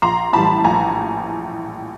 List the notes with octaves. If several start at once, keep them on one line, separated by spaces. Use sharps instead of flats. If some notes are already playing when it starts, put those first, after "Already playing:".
A#1 A#5 C6
A2 E3 G3 A5 B5
A#1 G#5 A#5